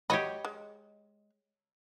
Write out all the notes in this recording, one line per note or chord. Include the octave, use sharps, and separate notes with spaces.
F#3 G4 C#5 D#5 B5
G#3